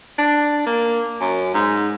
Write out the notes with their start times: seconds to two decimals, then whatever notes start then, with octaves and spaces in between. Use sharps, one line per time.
0.18 D4
0.66 A#3
1.21 F#2
1.54 G#2